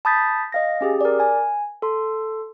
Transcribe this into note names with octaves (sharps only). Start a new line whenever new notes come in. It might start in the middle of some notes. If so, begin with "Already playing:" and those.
A5 B5 D#6 G6 A6 B6
D#5 F5 A#6
C#4 G4 G#4
A#4 D5
G#5
A4 C6